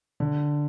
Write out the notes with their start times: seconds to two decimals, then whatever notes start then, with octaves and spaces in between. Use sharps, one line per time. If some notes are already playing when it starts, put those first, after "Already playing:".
0.20 D3